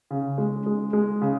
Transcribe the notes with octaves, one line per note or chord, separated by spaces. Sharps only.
C#3
G#3
G#3
G#3
C#3